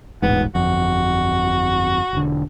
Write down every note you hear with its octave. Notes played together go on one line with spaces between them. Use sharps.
D#1 A1 G#2 B3
G1 F2 F#4
E1 D3